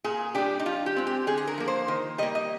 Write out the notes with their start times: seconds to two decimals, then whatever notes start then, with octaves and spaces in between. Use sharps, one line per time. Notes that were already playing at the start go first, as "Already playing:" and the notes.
0.04 A#2 G#4
0.35 G3 D4 G4
0.60 D#4
0.66 F3 F4
0.86 G4
0.96 G#3 C4
1.07 G4
1.27 D3 G#4
1.37 G#4
1.47 A#4
1.58 F3 A#3
1.68 C5
1.88 D#3
2.18 G3 D#5
2.23 A#3
2.35 D#5